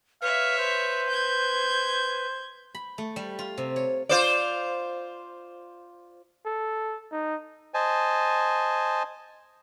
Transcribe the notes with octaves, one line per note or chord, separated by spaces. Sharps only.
B4 C#5 E5 F5
C5
G6 G#6
B5
A3
G3
F4
C3
C#5
F4 C5 D5
A4
D#4
C5 D#5 G#5 A5